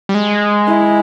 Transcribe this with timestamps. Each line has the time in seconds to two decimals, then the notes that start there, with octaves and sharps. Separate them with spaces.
0.09 G3
0.14 G#3
0.67 E4